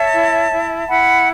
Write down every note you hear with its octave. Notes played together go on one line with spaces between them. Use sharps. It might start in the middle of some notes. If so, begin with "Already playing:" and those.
Already playing: C#5 E5 A5
E4
E4
E4 F#5 B5